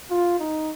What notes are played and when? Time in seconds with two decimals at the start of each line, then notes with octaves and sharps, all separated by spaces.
0.10 F4
0.39 D#4